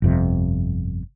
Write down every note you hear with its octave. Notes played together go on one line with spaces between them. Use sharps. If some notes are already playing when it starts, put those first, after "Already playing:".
G1 F2 C3